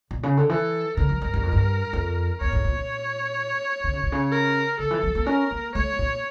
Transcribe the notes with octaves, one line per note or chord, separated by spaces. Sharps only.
A#2
C#3
D3
E3 A4
D3 A#4
F3
G2
G2
F2
G2
F2
E2 C#5
A2
A#2
A#2
D3
C#3
A#2
C#3
A#4
D3 A4
E3
F3
A#3
C#4 A#4
A#3
A3 C#5
A#2